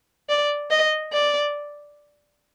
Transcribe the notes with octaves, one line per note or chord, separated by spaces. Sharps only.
D5
D#5
D5